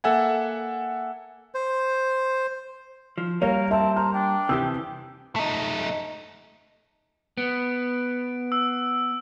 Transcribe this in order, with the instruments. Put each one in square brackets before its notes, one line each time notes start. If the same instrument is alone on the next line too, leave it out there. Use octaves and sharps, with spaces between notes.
[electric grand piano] A#3 A4 E5 F#5 G#5
[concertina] C5
[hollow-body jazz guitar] F3
[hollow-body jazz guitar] G3 A#3 [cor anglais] A#4 [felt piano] C#5 [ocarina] F5
[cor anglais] C4 [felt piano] E5 [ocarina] A5
[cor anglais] C5 [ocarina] A#5 [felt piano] F6
[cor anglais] D4 [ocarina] G5
[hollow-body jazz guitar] C3 E3 G4 [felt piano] D#6 E6
[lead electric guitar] A3 D#4
[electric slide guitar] B3 [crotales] D7
[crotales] E6